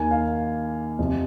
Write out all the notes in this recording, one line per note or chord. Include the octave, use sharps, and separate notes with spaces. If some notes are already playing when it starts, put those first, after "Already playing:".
Already playing: D#2 D#3 A#3 G#5
F5
F2 C3 F3